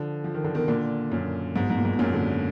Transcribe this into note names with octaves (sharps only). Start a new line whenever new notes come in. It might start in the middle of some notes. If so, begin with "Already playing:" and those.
Already playing: D3 F3
F3
D#3
D3
B2 D#3
A#2 D3
F#2 A#2
G#2 B2
G#2 B2
A#2
G#2
B2
F#2 A#2
A#2 D3
B2